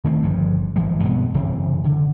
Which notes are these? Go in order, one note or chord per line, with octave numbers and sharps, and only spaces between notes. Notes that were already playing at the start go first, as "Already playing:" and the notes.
D#3 A3 C4
G1 G2 F3
G#1 E3 F3 G#3
G2 B2 B3 C4
F#1 C3 E3 C4
D3